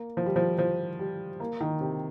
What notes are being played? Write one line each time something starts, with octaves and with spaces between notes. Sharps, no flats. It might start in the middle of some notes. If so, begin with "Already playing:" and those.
Already playing: A#3
F3
G3
F3
F3
G3
A#3
D#3
C3